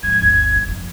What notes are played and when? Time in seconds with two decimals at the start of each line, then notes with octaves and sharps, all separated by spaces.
0.03 G#2 F3 G#6
0.22 G1 D2
0.56 G2
0.69 F#2 F3